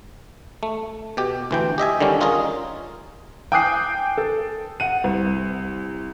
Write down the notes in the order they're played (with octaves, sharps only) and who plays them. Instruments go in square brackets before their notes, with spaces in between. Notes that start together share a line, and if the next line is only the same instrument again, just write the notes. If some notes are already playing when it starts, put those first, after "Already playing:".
[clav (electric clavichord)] A3
B2 G4
D2 E3 G5
G4 D#5 E5 G#5
D3 D#3 G3 C#4
C#4 F4 G#4 A#4 D#5
[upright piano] G5 G#5 D6 D#6 F#6 C7
A4
F#5 D#7
C2